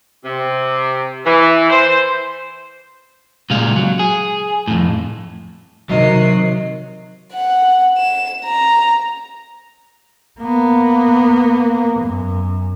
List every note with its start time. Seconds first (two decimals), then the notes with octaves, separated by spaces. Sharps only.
0.24 C3
1.26 E3
1.70 C5
3.50 A#2 C#3 G3 G#3 F5
3.76 F#3
3.99 G#4
4.68 F2 A2
5.89 C3 D#3 F#3 D#5 C7
7.33 F#5
7.98 E7
8.45 A#5
10.40 A#3 B3
12.01 F#2